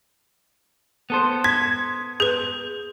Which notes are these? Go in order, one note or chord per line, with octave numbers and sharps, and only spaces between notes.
B3 A4 C5
G#6 B6
G#4 B4 G6